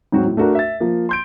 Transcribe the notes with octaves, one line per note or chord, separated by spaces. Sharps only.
G#2 F#3 C4 F#4
A2
A3 D4 F#4 A#4
E5 A6
F3 A#3
C6 G6 D7